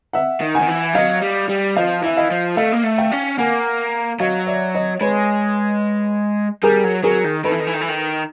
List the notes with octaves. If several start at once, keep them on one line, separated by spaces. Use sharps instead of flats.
E5 F#5
D#3
F#5 G#5
D#3
E3
F#3 D#5 F5
G3
G3
F3 D#5 F5
E3 E5
D#5 F5
F3
A3 D#5 F5
A#3
A3
F5 G5
C#4
A#3 F#5 G#5
F#3 D#5 F5
D5 E5
C#5 D#5
G#3 B4 C#5
G3 G#4 A#4
F#3
F#3 G#4 A#4
D#3
D#3 A4 B4
E3
D#3
E3
D#3
E3
D#3